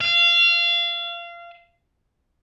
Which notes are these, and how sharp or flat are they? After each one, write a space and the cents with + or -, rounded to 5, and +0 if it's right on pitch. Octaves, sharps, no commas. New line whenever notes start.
F5 -25